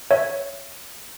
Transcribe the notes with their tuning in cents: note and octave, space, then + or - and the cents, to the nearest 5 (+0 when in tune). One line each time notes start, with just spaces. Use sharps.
C#5 +0 E5 +0